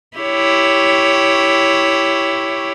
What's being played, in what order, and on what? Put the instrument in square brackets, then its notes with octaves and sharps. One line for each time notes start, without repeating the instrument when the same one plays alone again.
[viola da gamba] E4 G4 C#5